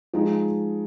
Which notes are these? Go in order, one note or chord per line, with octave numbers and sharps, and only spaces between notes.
F3 G#3 D#4